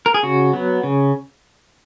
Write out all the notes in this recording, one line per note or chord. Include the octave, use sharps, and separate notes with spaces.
A#4
G#4
C#3 F#4
F#3 B3
C#3